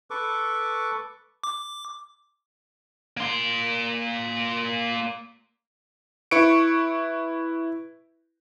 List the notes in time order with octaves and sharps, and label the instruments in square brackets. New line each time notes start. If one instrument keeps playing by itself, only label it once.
[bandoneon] A4 B4 C#6 D6
[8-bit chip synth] D6
[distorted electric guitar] A#3 C6
[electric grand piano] E4 B4 C#6 C#7 D7